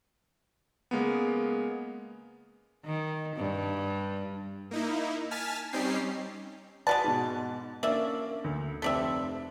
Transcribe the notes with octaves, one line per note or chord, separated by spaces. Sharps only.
C#3 G#3 A#3 B3
D#3
G2
A#3 D#4 E4
G#5 A5 F6 A6 B6
G3 C4 C#4 D#4 G4 C7
G#3 F#4 B4 D5 A5 B5
G#2 B2
A#3 C#4 D4 D5 E5
D2
F1 C4 A4 D5 E5 B6